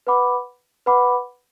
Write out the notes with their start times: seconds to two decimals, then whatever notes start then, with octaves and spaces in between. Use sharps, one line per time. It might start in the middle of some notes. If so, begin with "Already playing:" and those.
0.07 B4 F#5 B5 D6
0.86 B4 F#5 B5 D6